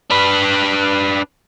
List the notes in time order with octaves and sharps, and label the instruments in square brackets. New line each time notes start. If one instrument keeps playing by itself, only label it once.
[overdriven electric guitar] D4 B4